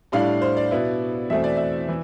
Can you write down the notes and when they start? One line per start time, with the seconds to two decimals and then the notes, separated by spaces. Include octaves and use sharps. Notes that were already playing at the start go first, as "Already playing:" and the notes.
0.12 A2 G3 D4 F5
0.42 C5
0.57 D5
0.71 B2 B3 E4
1.30 E2 B2 A3 C4 E5
1.44 D5
1.57 E5
1.88 E3